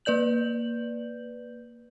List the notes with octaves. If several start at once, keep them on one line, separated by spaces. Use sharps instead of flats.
A#3 B4 D5 G6 F#7